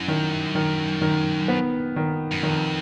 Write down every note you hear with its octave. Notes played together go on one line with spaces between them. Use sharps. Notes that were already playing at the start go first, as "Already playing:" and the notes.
Already playing: F#2 E4
D#3
D#3
D#3
B3
D#3
F#2
F2 D#3